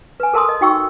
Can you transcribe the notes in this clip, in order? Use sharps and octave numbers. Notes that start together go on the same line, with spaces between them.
B4 G#5
A4 A#4 A5 C6 D#6
D#5
D#4 F#4 G5 C#6 E6